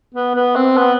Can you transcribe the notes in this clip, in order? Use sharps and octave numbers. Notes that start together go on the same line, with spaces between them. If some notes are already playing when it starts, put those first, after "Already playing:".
B3
B3
C4
B3